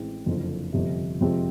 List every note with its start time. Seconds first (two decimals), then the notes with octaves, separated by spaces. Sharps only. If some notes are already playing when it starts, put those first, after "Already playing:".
Already playing: A1 A2 E3 G#3 C4
0.26 F#1 F2 D3 F3
0.73 G1 F2 C3
1.21 F2 C3 F3 G#3 C4